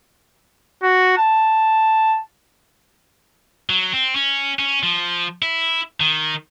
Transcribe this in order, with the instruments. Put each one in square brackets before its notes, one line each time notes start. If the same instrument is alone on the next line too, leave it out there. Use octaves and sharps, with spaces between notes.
[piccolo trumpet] F#4
A5
[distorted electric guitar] F#3
C4
C#4
C#4
F3
E4
D#3